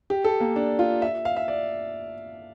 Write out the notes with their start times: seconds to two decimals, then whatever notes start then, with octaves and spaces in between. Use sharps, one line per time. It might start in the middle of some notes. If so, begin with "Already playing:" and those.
0.10 G4
0.24 A4
0.40 A#3
0.56 D4
0.79 F4
1.02 E5
1.25 F5
1.37 E5
1.48 D5